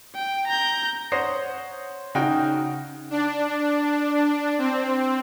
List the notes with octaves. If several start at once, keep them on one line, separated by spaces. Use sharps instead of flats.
G5
A#5 G6
C5 C#5 F#5 D#6 A#6 C7
C#3 D#4 F#4 G5 D7
D4
C4